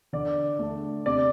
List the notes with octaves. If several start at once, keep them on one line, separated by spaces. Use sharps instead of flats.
D3 D5
A3 D4
C3 D5